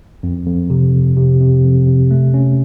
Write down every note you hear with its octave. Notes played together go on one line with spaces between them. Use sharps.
F2
F2
C3
F2
C3
C3
F2
C3
A3
C#4